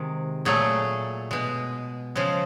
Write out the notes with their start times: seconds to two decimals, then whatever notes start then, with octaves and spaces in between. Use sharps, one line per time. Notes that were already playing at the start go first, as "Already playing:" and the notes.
Already playing: C3 D#3 G#3
0.45 A#2 F#3 A3 G#4
1.31 B2 G#3
2.15 C#3 F3 G#3